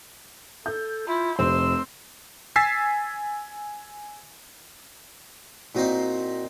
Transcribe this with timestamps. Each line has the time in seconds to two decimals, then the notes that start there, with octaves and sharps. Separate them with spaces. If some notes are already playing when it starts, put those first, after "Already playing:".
0.66 A4 G6
1.08 E4 F4
1.39 F1 C4 C6 E6
2.56 G#5 E6 G#6 A6 B6 C7
5.75 A#2 C4 D#4 E4 F#4